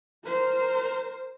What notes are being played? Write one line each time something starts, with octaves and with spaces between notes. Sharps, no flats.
A#4 C5